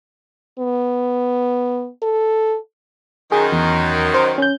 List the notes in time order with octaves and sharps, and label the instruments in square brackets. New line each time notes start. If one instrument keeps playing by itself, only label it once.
[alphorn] B3
A4
[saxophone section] F#2 D#3 [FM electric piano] G#4
[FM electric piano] E2
C5
C#4 G6